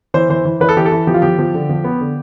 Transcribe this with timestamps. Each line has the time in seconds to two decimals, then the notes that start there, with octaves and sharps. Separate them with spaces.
0.14 E3 C5
0.29 E3 C5
0.45 E3
0.60 E3 B4
0.69 A4
0.77 E3 G4
0.85 A4
0.92 E3
1.07 F3 G4
1.14 F4
1.22 F3 G4
1.38 F3
1.54 D3
1.69 F3
1.84 B3
2.00 D3